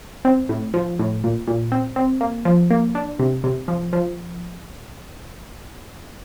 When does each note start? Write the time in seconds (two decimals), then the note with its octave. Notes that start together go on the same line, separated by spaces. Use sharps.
0.25 C4
0.49 A2
0.74 F3
0.99 A2
1.24 A#2
1.48 A#2
1.72 C4
1.96 C4
2.21 A#3
2.45 F3
2.70 A#3
2.95 D4
3.19 C3
3.44 C3
3.68 F3
3.93 F3